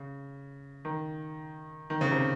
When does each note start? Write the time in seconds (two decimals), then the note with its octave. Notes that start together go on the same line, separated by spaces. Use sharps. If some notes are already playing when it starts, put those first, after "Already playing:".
Already playing: C#3
0.85 D#3
1.90 D#3
2.01 C#3
2.11 C3